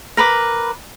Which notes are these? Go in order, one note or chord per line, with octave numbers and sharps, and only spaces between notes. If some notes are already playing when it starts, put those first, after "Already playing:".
A#4 B4 B5 D6